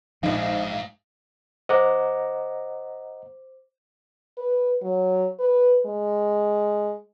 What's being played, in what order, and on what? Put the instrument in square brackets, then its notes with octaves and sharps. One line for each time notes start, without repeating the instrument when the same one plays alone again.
[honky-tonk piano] A#1 D#4 [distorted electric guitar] E2 G#2 [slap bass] F3 [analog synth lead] F5
[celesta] C5 D6 [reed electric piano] D#5 F#5 A#5
[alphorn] B4
F#3
B4
G#3